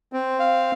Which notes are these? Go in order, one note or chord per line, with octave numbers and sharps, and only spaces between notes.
C4
F5